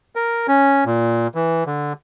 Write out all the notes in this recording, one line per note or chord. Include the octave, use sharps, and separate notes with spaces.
A#4
C#4
A#2
E3
D3